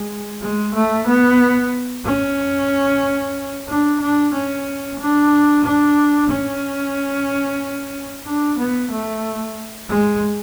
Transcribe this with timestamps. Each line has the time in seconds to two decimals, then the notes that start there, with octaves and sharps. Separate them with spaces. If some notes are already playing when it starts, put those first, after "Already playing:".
Already playing: G#3
0.42 G#3
0.74 A3
1.07 B3
2.04 C#4
3.68 D4
4.01 D4
4.33 C#4
4.99 D4
5.64 D4
6.30 C#4
8.26 D4
8.58 B3
8.91 A3
9.89 G#3